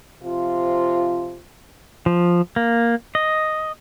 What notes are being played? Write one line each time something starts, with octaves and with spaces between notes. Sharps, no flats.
C3 F3 F4
F3
A#3
D#5